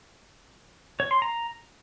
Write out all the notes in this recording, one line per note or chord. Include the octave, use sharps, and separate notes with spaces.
C#5
C6
A#5